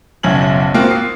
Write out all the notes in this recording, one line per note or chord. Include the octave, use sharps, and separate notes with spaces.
F#1 B1 C#4 E4 G#6 F#7
A#3 C4 F4 F#4 A#4
D#6 C7